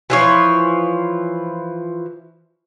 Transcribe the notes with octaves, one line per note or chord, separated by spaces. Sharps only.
E3 F3 C#5